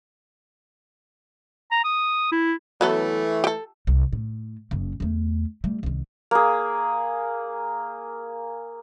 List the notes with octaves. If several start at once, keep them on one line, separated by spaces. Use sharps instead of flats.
A#5
D#6
E4
E3 F#3 A3 B3 A4
G4 A4
C2
A2
F#1 C#3
E2 A3
G3 A3
C2 D#3
A#3 G#4